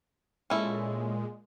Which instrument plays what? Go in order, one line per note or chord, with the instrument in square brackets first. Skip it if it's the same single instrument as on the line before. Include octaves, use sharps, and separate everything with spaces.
[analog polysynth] A#2 G#3 [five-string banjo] C#4 E4 A4